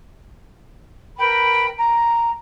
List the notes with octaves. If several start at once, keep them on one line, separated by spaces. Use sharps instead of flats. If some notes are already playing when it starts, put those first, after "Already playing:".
A#4 B4 G5 B5
A#5